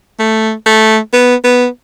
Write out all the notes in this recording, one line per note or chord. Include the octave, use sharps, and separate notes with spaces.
A3
A3
B3
B3